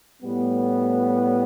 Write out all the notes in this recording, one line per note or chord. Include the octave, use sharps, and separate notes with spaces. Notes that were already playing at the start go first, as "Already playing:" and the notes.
A2 G3 B3